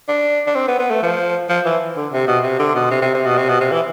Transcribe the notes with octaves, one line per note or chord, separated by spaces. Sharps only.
D4
D4
C4
B3
B3
A3
F3
F3
E3
D3
C3
B2
C3
D3
B2
C3
C3
C3
B2
C3
B2
C3
E3